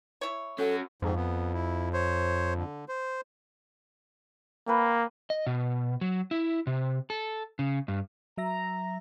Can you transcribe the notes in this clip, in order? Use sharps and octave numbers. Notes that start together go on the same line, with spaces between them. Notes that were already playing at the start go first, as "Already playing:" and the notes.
E4 C#5
C#4 F#4 A4
F2 G#2
B3
E4
C5 C#5
D3
C5
A#3 B4 G5
D#5
B2
F#3
E4
C3
A4
C#3
G2
F#3 E5 A#5 A#6